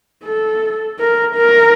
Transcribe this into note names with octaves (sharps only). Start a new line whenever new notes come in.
A4
A#4
A#4